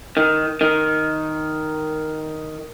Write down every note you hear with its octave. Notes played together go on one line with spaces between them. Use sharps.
D#3
D#3